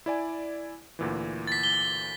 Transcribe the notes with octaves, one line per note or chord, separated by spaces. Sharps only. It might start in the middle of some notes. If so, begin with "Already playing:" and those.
E4 D5 G#5
D2 A#2 E3
A6 B6
G7